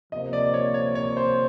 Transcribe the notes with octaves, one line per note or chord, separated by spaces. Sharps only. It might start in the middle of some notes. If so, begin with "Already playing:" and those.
C3 F3 A#3 D#5
D5
C#5
C#5
C#5
C5